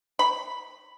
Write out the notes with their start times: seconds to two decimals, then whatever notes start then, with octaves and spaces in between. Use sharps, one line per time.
0.19 B5